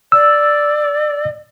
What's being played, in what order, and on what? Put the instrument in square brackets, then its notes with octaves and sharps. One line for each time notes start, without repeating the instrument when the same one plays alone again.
[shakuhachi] D5 [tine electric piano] E6